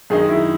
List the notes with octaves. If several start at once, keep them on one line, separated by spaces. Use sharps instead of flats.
F#2 D#3 G#3 D#4 G#4
E4